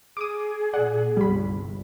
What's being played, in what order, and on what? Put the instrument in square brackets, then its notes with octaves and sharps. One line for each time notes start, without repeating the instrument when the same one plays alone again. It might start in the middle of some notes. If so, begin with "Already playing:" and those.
[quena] G#4 [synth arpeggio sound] D6 D#6
[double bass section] A#2 [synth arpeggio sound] D5 F#5
[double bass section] G1 C2 [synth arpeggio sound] G3 B5